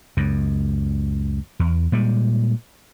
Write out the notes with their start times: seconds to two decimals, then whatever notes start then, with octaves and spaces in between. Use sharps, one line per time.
0.17 C#2 F#2
1.59 E2
1.92 A#2 G3 G#3